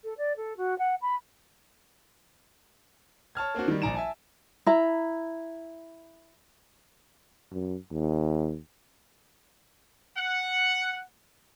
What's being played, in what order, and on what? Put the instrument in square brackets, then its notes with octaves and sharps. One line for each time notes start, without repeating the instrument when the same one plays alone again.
[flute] A4
D5
A4
F#4
F#5
B5
[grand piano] C#5 A5 F6 G#6
A#3 C4 D4 F#4
D#3 G3
A#1 D5 G#5 A#5 D7 E7
E5 G#5 A5
[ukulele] E4 A#5
[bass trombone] F#2
D#2
[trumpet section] F#5